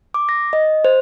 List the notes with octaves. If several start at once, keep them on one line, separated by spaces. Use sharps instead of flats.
D6
A#6
D#5
C5